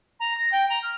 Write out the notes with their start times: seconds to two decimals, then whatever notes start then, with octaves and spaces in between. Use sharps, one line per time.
0.19 A#5
0.37 A#6
0.51 G5
0.69 A#5
0.82 F6